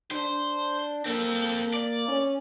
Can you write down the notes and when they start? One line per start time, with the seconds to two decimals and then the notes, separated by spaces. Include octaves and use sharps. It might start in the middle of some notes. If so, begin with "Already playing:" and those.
0.11 D4 C5
1.06 A#3 C4 A4
1.74 D5
2.08 C#4